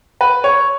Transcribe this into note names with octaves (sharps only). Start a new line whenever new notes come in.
B4
C#5